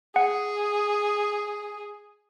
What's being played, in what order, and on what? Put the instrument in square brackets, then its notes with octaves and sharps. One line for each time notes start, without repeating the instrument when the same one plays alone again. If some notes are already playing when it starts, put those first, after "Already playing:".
[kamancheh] G#4 [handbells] F#5